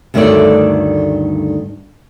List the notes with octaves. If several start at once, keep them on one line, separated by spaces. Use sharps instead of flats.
D2 G2 D#3 A3 C#5 D5